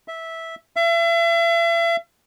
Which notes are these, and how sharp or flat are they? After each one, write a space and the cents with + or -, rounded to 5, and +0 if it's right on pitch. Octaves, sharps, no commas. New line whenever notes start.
E5 -10
E5 +40